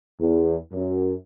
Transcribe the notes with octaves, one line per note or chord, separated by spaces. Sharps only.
E2
F#2